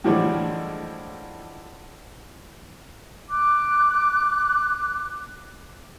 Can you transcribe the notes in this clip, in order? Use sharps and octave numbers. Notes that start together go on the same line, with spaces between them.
A2 D3 E3 F3 G3 G#3
D6 F#6